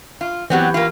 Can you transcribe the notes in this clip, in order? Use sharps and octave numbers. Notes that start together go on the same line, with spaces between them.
F4
E3 F#3 B3 C4 G4
A#3 F4